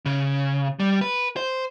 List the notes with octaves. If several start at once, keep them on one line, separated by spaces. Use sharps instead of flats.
C#3
G3
B4
C5